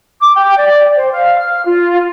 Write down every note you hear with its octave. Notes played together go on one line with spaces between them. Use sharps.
D6
G5
D5
C5
F5
F6
F4